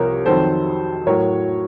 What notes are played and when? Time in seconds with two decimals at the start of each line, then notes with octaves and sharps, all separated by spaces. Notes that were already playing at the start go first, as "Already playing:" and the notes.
Already playing: C2 C3 F3 A#4 C#5
0.26 F2 D#3 F#3 A4 C5
1.07 A2 F#3 A#4 C#5